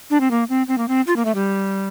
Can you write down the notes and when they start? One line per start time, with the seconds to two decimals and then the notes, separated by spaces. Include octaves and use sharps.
0.10 D4
0.20 C4
0.31 A#3
0.49 C4
0.68 C4
0.78 A#3
0.88 C4
1.07 F4
1.16 A#3
1.25 A3
1.35 G3